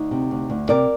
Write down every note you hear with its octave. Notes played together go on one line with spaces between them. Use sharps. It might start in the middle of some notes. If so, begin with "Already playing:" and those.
Already playing: D2 D#4
C3
D2
D2
C3 A#4 D5